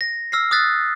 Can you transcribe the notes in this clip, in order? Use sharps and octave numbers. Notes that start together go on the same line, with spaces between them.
A#6
E6 F6 A#6 C7
D#6 E6 F#6 A6 B6